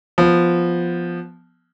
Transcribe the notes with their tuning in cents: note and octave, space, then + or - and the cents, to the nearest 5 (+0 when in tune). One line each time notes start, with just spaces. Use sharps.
F3 +0 B3 +0